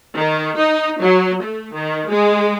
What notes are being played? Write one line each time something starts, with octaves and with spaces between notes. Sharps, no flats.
D#3
D#4
F#3
A3
D#3
G#3